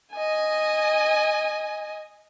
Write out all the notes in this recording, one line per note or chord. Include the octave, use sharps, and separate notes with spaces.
D#5 G#5